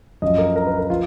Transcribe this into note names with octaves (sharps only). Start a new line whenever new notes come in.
F#2 F3 D#5
A#4
A#4
B4
A#4
F3 F4